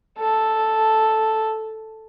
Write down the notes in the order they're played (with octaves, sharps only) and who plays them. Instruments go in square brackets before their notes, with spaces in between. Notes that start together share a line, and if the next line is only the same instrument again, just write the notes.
[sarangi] A4